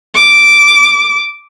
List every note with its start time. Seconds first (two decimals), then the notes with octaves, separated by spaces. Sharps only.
0.14 D6